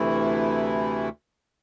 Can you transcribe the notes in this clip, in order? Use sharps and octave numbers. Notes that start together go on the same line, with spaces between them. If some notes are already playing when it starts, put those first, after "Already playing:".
Already playing: D2 C3 E3 A3 E4